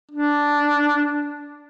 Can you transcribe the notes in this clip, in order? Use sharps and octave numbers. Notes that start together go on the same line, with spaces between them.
D4